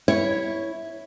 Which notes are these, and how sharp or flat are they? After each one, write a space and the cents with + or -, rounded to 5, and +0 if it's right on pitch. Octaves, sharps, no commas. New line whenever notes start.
E4 -5 C#5 +0